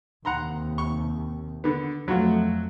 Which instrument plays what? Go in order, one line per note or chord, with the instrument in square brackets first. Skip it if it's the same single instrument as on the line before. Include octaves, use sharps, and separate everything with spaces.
[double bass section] D#2 C3 [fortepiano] F#5 A#5 C6
[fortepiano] C#6
D3 B3
[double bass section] F2 A3 [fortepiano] F#3 F4 F#4